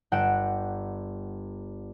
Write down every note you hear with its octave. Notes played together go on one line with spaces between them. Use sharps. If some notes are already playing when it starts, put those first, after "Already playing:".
G1 F#5 G5 D7 E7